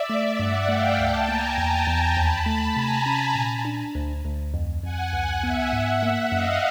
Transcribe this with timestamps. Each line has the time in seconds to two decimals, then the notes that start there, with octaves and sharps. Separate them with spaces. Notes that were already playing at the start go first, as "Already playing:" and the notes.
Already playing: D5 E5
0.10 A3
0.39 G2 E5 F#5
0.68 A3 F5 G5
0.98 C#2 G5 A5
1.28 A#3 G#5 A#5
1.58 E2 G#5 A#5
1.87 E2
2.17 D#2 A5 B5
2.46 A3
2.76 C3 G#5 A#5
3.06 C#4
3.35 A#2
3.65 D4
3.95 D2
4.25 D2
4.54 F2
4.83 F2 F#5 G#5
5.13 C#2
5.43 B3 E5 F#5
5.73 G#2
6.03 A#3
6.32 F#2 D#5 F5